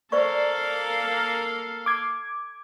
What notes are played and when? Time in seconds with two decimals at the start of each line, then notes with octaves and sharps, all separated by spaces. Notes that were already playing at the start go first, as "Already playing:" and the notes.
0.12 A#3 A4 C5 D5 F5 C#6
1.86 D6 G#6